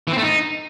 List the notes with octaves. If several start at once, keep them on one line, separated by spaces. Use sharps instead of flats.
E3
C4
A3
D#4